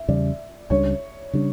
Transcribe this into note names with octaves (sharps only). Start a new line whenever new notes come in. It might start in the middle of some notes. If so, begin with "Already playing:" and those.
Already playing: E5
E2 C#3 G3 D5
C#2 C#3 G3 D4 C#5
C#3 G3 D4